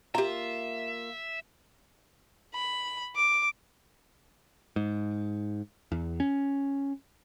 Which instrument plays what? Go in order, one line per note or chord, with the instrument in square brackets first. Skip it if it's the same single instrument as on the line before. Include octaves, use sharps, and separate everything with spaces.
[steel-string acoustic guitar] A#3 F4 [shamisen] G4 A#5 [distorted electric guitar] E5
[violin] B5
D6
[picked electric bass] G#2
E2
C#4